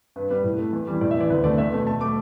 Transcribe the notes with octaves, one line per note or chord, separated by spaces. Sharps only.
G2 B4
G3 B3 B4
A2
A3
E2
E3 G3
A2 D5
E5
E3 B3 D5
D2 B4
D3 A3 D5
E2 E5
B2 A3
B2 A5
A3 D6